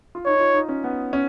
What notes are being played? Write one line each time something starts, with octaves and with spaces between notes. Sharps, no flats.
F4
D#4 C#5
D#4
F4
D#4
C#4
B3
C#4